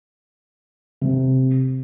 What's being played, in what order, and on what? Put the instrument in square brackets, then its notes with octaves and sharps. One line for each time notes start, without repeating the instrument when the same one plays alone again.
[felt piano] C3